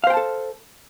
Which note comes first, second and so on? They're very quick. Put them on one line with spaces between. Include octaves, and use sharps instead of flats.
F5 C5 G5 A5 A4